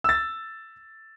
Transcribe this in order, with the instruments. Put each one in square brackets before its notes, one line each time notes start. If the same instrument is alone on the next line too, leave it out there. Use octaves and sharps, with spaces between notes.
[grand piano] E6 A6